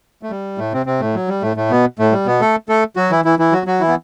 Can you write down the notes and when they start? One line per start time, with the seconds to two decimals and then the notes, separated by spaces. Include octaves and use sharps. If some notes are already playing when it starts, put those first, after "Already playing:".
0.23 A3
0.30 G3
0.58 A2 A3
0.73 C3 C4
0.86 C3 C4
1.00 A2 A3
1.15 F#3
1.28 G3
1.42 A2 A3
1.56 A2 A3
1.71 B2 B3
1.99 A2 A3
2.12 G3
2.26 B2 B3
2.41 A3 A4
2.69 A3 A4
2.96 F#3 F#4
3.11 E3 E4
3.25 E3 E4
3.39 E3 E4
3.52 F#3 F#4
3.66 F#3 F#4
3.80 E3 E4
3.88 B3